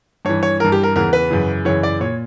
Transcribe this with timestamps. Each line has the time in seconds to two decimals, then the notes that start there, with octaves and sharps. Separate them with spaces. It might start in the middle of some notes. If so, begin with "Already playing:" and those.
0.25 G2 E3 C#5
0.43 C#5
0.60 G2 E3 A#4
0.72 G4
0.83 A#4
0.95 E2 C#3 E3 A#4
1.13 B4
1.31 F#2 C#3 E3
1.65 F#2 C#3 E3 C#5
1.83 D5
2.01 A#2 C#5